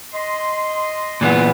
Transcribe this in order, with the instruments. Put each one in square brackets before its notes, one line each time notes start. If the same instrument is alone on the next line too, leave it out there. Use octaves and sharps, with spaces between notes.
[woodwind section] D#5 C6
[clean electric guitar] A#2 E3 B3